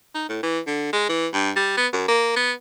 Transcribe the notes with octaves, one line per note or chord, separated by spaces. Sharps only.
D#4
A2
E3
D3
G#3
E3
G2
G3
B3
F#2
A#3
B3